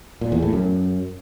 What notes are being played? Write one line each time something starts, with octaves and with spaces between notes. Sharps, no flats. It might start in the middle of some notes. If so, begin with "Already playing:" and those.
A#2
E2
A2
F#2